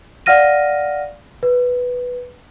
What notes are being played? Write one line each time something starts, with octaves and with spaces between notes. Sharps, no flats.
D5 F5 F#5 F6 A#6 D#7
B4